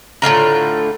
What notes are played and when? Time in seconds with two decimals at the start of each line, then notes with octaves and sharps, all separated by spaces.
0.22 A2 D3 F4 A#5